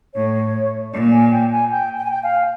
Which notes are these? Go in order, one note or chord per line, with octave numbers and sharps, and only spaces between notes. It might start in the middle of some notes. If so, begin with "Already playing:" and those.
A2 C#5
A#2 D5
G#5
G5
G#5
G5
G5
G#5
G5
F5